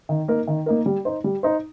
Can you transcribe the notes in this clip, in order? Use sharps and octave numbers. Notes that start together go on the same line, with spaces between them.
D#3
A#3 D#4 A#4
D#3
A#3 D#4 A#4
G3
D#4 C5
G3
D#4 C5